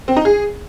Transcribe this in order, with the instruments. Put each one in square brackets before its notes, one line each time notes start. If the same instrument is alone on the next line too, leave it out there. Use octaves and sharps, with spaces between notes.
[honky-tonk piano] C4
D#4
G#4